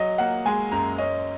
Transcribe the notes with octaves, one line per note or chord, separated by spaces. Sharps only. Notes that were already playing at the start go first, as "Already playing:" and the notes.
Already playing: F#3 D#5
A#3 F#5
G#3 G#5
F#2 A#5
C#4 D#5